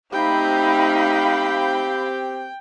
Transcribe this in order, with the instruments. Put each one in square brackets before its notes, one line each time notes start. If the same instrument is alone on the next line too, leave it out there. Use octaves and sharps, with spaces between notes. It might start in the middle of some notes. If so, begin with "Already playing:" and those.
[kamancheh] A3 D#4 [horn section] C4 G4 [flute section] F5 B5 [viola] G5